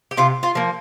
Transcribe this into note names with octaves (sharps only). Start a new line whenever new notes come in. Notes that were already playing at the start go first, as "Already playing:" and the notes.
G4
C3 F4
F4
F3 A#3